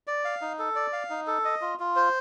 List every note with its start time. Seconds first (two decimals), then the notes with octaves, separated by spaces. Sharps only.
0.07 D5
0.25 F5
0.41 D#4
0.59 A4
0.75 D5
0.93 F5
1.10 D#4
1.27 A4
1.45 D#5
1.61 F4
1.80 F4
1.96 C5